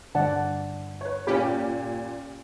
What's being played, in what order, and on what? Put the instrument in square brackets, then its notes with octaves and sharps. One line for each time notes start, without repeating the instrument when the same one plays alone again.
[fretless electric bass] G2 D3 [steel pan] D5 F#5 A5
[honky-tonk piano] B4 C#5
[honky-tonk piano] A#2 [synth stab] C#4 G4 [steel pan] B5